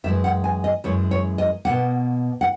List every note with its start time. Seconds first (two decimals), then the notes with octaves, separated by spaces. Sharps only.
0.04 F#2 E3 G#3 E5
0.24 F#5
0.44 G#5
0.64 D#5
0.84 F#2 E3 G#3 C#5
1.11 C#5
1.38 D#5
1.65 B2 A#3 F#5
2.41 F#5